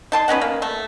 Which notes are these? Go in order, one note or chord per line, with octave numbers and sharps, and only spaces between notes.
D#4 A5 C6
B3 C#4 D#4 F#5
A#3
A3